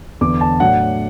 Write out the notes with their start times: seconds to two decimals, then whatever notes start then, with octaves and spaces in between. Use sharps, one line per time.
0.21 E2 D3 B3 D4 D6
0.41 A5
0.60 A2 F#3 A3 D4 F#5